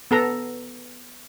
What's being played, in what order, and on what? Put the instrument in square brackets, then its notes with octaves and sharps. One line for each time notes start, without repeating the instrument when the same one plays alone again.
[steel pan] B3 A4 A#5